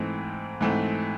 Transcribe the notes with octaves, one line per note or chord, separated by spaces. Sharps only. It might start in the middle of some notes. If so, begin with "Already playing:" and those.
Already playing: G#2 E3 A3 C4
G#2 E3 A3 C4